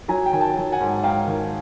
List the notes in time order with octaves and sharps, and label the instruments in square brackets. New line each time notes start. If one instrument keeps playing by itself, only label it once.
[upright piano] F#3 G#5 A#5
G5
D#3 G#5
G5 A5
F#3
F#5 G#5
G#2
G#2 F5 G5
D#3